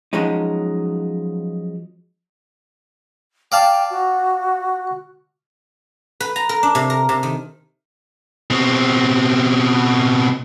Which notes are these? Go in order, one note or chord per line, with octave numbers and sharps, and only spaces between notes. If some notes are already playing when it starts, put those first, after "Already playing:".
F3 F#3 G#3 C#4 D#4
D5 F5 G5 A5
F#4
B4
A#5
A#4
D4
C3
A#4
C3
D#3
B2 C4